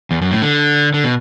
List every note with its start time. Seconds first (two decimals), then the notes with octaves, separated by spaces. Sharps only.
0.11 E2
0.22 F#2
0.31 A2
0.42 D3
0.94 D3
1.04 B2